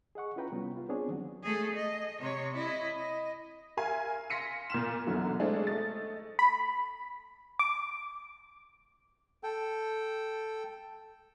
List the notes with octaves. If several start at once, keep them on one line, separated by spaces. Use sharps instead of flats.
G#4 D#5 F#5 C#6
C#4 E4 F4 B4 G5 A#5
C3 G3 B3 C#4
F4
B3 C4 D4 G#4 C#5
D#3 F#3 F#4
A3 G#4
D#5
C3 C#5
E4 D#5
D#5
A#4 E5 F5 G#5
F5 C6 A#6 B6 C#7 D#7
A#2 F6 E7
F#2 B2 D3 E3 F#3
G#3 A3 C4 D4 G#4
A3 D#5 A6
B5
D6
A4 G5